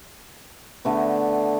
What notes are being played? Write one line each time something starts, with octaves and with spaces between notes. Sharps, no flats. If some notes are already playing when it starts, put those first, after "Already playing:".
D3 A3 B3